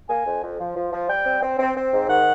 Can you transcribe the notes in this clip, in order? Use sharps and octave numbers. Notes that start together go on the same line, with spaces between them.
A#3 G#5
F2
F2
F3
F3
F3
G3 G5
C4
C4
C4
C4
G#2
D#3 F#5